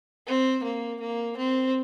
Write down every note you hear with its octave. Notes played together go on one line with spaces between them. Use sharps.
C4
A#3
A#3
C4